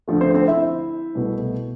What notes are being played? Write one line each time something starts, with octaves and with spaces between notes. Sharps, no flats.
D2 D3 F3 A3
C4 C5
C4 C5
E4 E5
C2 B2 A3